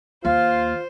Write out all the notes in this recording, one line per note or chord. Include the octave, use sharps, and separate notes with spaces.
D#2 F4 C5 F5